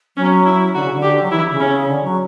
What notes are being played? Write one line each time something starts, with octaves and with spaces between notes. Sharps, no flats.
F#3 C#4
E4
D3 F#4
C#3
D3
G4
F#3
E3 E4
C#3
C#4
D3
F#3